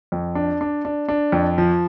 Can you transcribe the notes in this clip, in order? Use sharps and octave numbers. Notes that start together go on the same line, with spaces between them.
F2
D4
D4
D4
D4
F2
F3